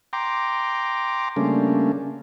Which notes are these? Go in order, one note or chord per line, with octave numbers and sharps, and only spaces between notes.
G5 A#5 C6 D6
C#3 G3 A3 A#3 C#4 D4